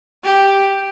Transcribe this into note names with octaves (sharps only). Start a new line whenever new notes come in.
G4